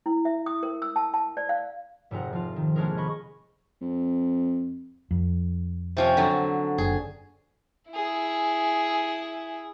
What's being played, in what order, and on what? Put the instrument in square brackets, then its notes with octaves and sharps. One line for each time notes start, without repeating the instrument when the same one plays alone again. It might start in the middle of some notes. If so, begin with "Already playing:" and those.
[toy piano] E4
E5
D#6
A#4
E6
A5
A5
D5
F5
[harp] F1 G#2 C3 A#4 F#5
F3 F4
D#3
G#3 A#3 C#4 D4 G#4 A#4
D#5 B5 C#6
[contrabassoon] F2
[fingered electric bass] F2
[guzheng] C3 F3 C#4
D3 F#3
[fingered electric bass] F#1 [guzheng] G#4
[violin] E4 G#4